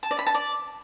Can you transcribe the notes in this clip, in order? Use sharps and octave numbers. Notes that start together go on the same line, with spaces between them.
A5
D5
B5
A5
D5